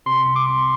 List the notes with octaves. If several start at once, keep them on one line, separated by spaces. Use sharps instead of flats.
C3 C6
C2
D6
C2